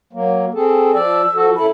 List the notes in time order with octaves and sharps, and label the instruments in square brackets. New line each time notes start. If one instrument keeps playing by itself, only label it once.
[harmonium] F#3 A#3
C4 G#4 A4
[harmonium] F3 D5 [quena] E6
[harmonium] F3 F#4 A4
[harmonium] F#2 E4 A4 [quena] B5